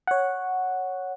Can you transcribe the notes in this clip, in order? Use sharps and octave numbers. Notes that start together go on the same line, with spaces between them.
C#5 F#5